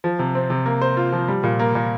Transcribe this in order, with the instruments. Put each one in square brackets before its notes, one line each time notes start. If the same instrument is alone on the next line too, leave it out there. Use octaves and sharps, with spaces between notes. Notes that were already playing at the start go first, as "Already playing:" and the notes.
[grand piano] F3
C3
C4
C3
A#3
C5
F4
F3
G3
A#2
A#3
A#2